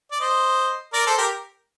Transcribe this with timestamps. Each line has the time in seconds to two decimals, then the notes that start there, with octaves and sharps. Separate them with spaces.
0.11 D5
0.21 C5 D#5
0.93 A#4 D5
1.07 A4 C5
1.18 G4 A#4